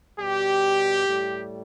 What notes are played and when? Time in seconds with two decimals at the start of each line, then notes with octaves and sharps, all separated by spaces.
0.17 B2 G3 G4
1.05 A2 G3